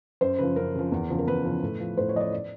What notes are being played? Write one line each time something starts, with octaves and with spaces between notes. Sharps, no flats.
F#2 C5
C#3 F3 B4
F#2 A#4
C#3 F3
E2
C#3 F3
A#4
E2 B4
C#3 F3
A2
F3
A2 C5
C#5
F3 D#5
D5
D5